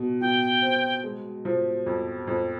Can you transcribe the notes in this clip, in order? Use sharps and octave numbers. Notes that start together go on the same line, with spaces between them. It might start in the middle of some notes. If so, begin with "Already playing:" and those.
Already playing: B2
B2 G5
C4
G#3
F3
F2
F2